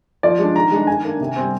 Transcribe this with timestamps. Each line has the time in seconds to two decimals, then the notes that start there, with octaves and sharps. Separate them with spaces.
0.23 F3 D5
0.39 G#3 D4
0.56 D#3 A#5
0.71 G#3 D4
0.87 D#3 G#5
1.05 A#3 D4
1.20 C3
1.36 G3 C4